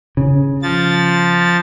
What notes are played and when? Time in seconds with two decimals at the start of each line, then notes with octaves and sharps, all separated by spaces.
0.17 C#3
0.62 F3 A6